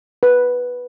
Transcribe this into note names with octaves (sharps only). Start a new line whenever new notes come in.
B4